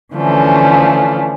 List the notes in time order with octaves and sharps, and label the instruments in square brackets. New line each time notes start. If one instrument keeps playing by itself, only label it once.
[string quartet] D3 E3 F3 A3 C#4